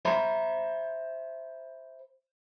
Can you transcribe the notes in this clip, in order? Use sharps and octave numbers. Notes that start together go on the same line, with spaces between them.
C5 E5 A#5 B5